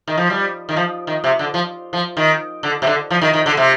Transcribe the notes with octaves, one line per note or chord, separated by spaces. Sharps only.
D#3
F3
G3
D#3
F3
D#3
C3
D3
F3
F3
D#3
D3
C3
D3
F3
D#3
D#3
D3
C3